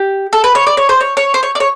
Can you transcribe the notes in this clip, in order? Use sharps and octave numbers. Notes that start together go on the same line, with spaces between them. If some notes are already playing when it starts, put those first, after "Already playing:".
Already playing: G4
A4
B4
C#5
D5
C#5
C5
C#5
C#5
C5
C#5
D5
C#5